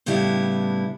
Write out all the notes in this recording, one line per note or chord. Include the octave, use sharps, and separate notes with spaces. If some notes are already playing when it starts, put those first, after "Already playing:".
A2 C#3 G3 B3 D4 E4